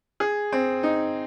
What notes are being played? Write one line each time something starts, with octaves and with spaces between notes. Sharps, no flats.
G#4
C4
D#4